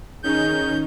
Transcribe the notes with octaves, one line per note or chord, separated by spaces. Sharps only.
D#3 C#4 D#4 G#4 G6